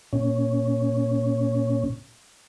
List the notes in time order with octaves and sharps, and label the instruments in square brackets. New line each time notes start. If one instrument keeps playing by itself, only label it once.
[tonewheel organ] A#2 C#4